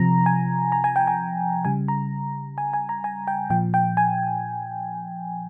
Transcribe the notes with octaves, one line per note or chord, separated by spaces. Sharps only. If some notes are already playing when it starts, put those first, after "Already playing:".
Already playing: C3 F3 A#5
G#5
A#5
G#5
G5
G#5
C#3 G3 G#5
A#5
G#5
G#5
A#5
G#5
G5
A#2 F3 G5
G5
G#5